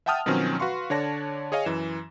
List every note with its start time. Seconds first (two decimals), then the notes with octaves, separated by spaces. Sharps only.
0.06 E5 F#5 G5 A5 D#6 F6
0.26 B2 D#3 F3 F#3 C4 C#4
0.60 F#4 B4 F5 C6 C#6
0.90 D3 D4 C#5 D5 A5 A#6
1.52 G#4 C#5 D#5 F5 G#5
1.65 F#2 E3 E7